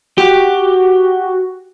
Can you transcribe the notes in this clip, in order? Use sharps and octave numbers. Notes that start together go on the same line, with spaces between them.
F#4 G4